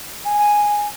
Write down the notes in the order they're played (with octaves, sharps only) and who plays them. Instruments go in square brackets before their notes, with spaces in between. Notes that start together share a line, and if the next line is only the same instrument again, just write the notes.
[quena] G#5